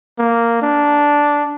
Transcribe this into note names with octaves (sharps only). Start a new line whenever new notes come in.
A#3
D4